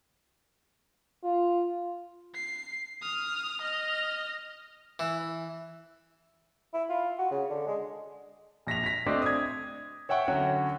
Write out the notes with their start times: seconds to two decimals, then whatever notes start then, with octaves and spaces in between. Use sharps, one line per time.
1.24 F4
2.34 C7
3.02 D#6 F6
3.61 D#5 F6
4.99 E3
6.74 E4
6.90 F4
7.18 F#4
7.31 C#3
7.50 D3
7.67 G#3
8.67 A#1 A#6 B6 F7
8.84 A#6 B6
9.06 A3 C4 D4 C5 D5 D#5
9.22 D#6 G#6
10.09 C#5 E5 F#5 G5 C#6
10.28 D3 F#3 C#4 F#4